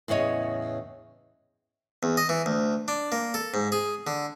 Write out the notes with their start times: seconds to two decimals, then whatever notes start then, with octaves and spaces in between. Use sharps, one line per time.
0.08 E2 A2 C#3 C#5 D#5
2.03 E2
2.17 D#5
2.29 E3
2.46 D2
2.88 D4
3.12 A#3
3.34 A4
3.54 G#2
3.72 G#4
4.07 D3